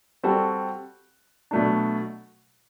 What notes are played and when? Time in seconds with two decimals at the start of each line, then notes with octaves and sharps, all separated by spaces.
0.23 G3 C4 F#4 A4
1.51 B2 F#3 A3 D4